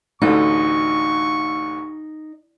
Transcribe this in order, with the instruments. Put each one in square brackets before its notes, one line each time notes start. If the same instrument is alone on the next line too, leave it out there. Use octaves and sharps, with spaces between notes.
[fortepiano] A1 D2 D3 [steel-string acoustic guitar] D#4 [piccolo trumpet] C#6